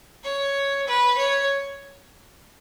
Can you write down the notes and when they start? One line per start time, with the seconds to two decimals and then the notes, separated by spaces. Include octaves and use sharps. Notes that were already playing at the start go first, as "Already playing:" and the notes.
0.23 C#5
0.87 B4
1.17 C#5